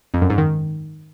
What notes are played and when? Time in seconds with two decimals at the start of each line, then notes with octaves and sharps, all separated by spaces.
0.14 F2
0.22 F#2
0.30 G#2
0.38 D#3